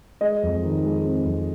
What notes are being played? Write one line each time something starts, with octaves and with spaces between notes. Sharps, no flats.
G#3 D#5
F2
D#3
G#3
C4
F2